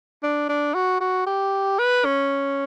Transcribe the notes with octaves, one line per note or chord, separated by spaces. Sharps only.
D4
D4
F#4
F#4
G4
B4
C#4